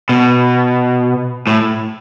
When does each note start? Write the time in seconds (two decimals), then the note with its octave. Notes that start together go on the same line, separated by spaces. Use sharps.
0.09 B2
1.47 A2